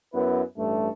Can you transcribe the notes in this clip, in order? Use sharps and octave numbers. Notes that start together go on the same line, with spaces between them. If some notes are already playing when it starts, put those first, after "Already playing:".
F#2 B3 E4 B4
A1 G2 A3